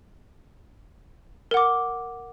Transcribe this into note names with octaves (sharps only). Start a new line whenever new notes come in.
A#4 F#5 D6